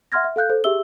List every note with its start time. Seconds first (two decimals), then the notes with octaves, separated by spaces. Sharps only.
0.12 E5 F#5 C6 F6 G#6 A#6
0.24 E5
0.36 A4 F5 F#6 G6
0.50 A4 C5
0.64 G4 G#4 E5 E6 G7